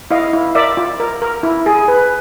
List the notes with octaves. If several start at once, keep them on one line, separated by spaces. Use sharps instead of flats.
E4 D#5 F5
E4
A#4 D5 E5
F4
A#4
A#4
E4
G#4
B4